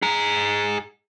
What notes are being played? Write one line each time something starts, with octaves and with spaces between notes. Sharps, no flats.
G#4 A#5